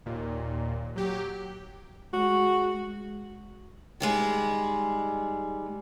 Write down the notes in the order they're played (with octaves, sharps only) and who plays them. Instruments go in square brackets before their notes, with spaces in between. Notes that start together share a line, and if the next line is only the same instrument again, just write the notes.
[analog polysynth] D#2 A#2
F#3 G4
[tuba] G#3 [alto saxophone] F#4
[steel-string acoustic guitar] D#3 G3 G#3